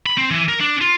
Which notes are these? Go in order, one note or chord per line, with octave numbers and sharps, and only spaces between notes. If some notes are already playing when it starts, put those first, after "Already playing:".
B5
C4
E3
A#4
D4
F4